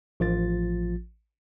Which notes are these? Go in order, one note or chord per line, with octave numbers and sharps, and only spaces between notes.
A1 F3 F4 A6